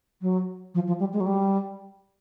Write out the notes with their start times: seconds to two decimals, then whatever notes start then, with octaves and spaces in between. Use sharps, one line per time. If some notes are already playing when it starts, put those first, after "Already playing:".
0.22 F#3
0.74 F3
0.87 F3
0.99 G3
1.13 G#3
1.20 F#3
1.26 G3